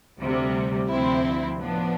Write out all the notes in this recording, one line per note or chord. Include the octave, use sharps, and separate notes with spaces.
D2 C3 G3
D2 C3 F3 C4 E4
A2 F3 B3 D4